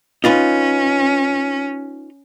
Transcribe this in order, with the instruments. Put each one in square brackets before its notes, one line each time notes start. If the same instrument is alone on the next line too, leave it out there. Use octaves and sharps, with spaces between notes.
[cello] C#4 [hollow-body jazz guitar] D#4 F4 B4